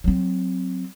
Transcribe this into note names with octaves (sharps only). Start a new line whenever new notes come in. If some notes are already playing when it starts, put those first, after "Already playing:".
F#3 C4